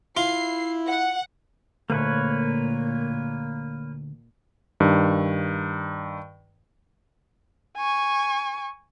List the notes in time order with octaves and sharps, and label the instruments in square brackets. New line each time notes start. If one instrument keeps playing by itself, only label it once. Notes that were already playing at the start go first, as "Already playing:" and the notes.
[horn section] E4 [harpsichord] F4 [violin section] C7
[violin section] F#5
[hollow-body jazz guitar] D2 [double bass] A#2 [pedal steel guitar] A#3 B4 C#5
[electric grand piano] G2 D#3
[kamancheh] G#5 C#6